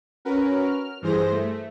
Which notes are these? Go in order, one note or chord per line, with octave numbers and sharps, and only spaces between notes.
C#4 F#4 A#4 B4
F6
G2 E3 G#4 C5 A#6
A3